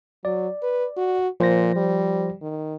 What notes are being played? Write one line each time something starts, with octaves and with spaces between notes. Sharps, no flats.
F#3 D5
B4
F#4
A#2 F3 C5 A#6
G3
D#3